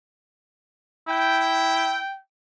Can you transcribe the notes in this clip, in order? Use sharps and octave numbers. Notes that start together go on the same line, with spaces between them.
E4 G5